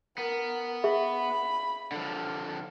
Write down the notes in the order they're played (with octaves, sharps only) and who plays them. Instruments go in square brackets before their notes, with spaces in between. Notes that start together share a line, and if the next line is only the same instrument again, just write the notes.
[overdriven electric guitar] B3 [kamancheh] A#4
[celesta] G#4 E5 [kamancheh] B5
[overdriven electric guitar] D3 F3